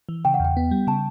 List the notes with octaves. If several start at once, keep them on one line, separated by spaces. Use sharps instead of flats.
E3
C#3 G5
F#5
E2 G5
B3
G3
C#3 A5